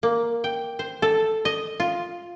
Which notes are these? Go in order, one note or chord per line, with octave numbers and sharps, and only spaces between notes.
A#3
G5
C5
A4
D#5
F4